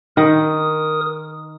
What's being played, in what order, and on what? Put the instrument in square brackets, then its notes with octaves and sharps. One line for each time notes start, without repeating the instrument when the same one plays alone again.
[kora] D#3 [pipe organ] A#4 D#6